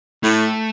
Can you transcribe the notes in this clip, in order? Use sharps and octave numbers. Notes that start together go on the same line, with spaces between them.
A2 A3